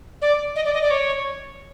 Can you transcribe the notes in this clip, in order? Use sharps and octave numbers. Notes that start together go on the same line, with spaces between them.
D5
D#5
D5
D#5
D5
C#5